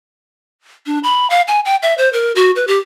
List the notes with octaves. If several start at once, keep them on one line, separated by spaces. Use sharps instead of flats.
D4
B5
F5
G#5
G5
E5
C5
A#4
F#4
B4
G4